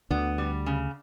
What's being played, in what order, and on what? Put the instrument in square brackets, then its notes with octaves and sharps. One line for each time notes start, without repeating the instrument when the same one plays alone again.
[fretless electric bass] D2 D3 [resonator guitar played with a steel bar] B3
[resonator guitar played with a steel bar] G3
C#3